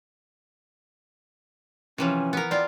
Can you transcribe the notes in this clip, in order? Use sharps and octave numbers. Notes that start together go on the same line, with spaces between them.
C3 E3 F3 C#4
B3 A#4
C4 F4 D5